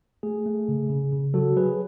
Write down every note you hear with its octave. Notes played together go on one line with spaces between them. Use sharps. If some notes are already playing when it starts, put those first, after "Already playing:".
A3 G#4
A3
C#3
C#3
C#3
F#3 F#4 A4
F#3 G#4 B4